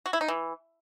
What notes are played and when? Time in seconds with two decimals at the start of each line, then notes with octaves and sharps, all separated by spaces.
0.06 F#4
0.13 E4
0.21 D#4
0.28 E3